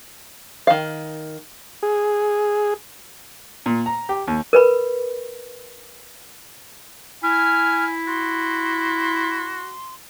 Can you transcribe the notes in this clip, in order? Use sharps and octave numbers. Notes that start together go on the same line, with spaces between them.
D#3 F5
G#4
A#2
A#5
G4
D#2
A#4 B4 B5
E4 G#5 F6
F#4 C6